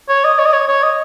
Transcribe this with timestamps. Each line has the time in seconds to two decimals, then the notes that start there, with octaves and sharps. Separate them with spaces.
0.09 C#5
0.24 D#5
0.39 C#5
0.46 D#5
0.54 C#5
0.68 C#5
0.83 D#5